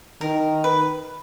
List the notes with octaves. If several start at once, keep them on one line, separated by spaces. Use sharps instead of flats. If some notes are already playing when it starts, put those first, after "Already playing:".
D#3 A#4
B4